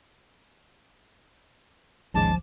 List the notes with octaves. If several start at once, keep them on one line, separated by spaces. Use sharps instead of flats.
A1 D#2 G#2 C#3 F3 G#3 A5 D6